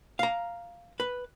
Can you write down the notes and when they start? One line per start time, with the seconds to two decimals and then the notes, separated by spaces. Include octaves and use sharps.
0.19 F5 A#5
1.00 B4